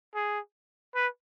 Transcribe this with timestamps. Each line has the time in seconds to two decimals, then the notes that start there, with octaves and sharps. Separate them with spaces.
0.15 G#4
0.95 B4